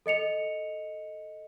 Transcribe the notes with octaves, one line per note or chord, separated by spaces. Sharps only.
A4 D#5 C#7 F7